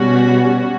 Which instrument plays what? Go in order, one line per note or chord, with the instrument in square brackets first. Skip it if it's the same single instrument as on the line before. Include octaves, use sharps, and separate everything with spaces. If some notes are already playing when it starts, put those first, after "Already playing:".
Already playing: [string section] B2 G3 C#4 F#4